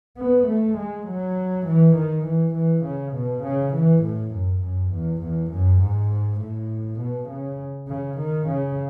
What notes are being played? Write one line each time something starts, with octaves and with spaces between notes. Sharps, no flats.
B3
A3
G#3
F#3
E3
D#3
E3
E3
C#3
B2
C#3
E3
A2
F#2
F#2
E2
E2
F#2
G#2
A2
B2
C#3
C#3
D#3
C#3